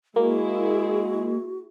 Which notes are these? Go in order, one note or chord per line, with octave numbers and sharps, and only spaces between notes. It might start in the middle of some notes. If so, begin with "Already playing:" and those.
G#3 A#3 E4 F#4 G#4